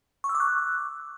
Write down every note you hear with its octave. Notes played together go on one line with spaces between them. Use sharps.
C#6
E6
D6
F#6